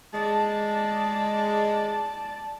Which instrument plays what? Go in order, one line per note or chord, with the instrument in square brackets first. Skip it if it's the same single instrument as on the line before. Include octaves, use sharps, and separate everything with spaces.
[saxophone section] G#3 [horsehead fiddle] D5 A5